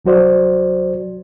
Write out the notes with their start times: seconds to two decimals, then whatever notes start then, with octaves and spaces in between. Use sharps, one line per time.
0.05 C2 F#3 F#4 C5 D5